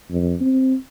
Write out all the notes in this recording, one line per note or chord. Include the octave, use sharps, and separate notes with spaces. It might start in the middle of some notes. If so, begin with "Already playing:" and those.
F2
C4